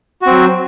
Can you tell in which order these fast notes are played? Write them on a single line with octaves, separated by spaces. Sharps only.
F#4 C4 F#3